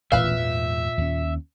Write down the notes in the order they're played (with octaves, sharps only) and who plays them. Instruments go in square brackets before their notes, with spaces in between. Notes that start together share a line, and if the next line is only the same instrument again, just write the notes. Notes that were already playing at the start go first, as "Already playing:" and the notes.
[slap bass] E1 A1 D#2 [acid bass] A#2 [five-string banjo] B4 F5 [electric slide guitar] E5
[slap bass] E2 G#2
D#2 C#4